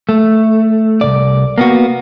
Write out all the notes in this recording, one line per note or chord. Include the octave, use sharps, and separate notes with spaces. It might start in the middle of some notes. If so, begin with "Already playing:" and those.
A3
C2 A#2 D5
A#3 B3 F#4